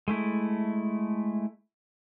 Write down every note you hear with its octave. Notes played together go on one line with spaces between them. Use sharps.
G#3 A3 E4